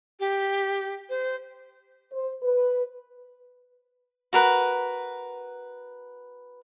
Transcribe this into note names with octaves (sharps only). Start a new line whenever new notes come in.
G4
C5
C5
B4
F#4 A#4 B4